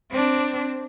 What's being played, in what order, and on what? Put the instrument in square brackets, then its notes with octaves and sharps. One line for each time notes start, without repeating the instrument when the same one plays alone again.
[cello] C4 D4